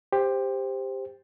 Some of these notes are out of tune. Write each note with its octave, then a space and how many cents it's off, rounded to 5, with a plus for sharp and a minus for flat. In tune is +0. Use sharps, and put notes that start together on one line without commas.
G4 +15 C5 +0